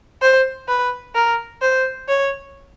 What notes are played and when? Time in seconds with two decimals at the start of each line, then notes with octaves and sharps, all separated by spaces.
0.22 C5
0.68 B4
1.15 A#4
1.61 C5
2.08 C#5